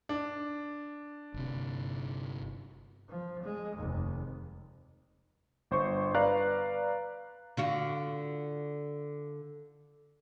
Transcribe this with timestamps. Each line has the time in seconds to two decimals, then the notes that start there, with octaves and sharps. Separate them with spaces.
0.09 D4
1.34 G1 C3
3.09 F3
3.43 G#3
3.77 F1 D#2
5.71 G1 C5 C#6
6.15 B4 D5 F5 A#5 F#6
7.57 D3 F4 F#4